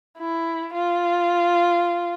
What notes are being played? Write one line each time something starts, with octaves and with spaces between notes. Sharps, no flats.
E4
F4